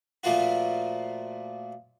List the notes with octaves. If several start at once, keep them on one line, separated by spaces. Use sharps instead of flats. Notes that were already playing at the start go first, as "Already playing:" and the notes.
A#2 F3 A3 A#3 F4 F#4